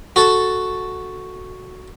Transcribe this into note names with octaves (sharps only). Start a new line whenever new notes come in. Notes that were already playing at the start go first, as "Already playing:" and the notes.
F#4 A4